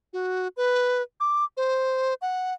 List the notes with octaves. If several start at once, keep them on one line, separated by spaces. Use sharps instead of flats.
F#4
B4
D6
C5
F#5